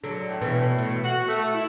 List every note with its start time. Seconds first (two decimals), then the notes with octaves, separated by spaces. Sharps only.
0.04 D3 F#3 D4
0.29 A2
0.41 B2 E3
0.54 A2
0.79 B2 A3
1.04 F#4
1.28 A3
1.53 E4